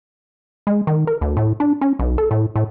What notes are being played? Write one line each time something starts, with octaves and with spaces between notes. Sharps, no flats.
G#3
D#3
A#4
D2
A2
D4
C#4
B1
A4
A2
A2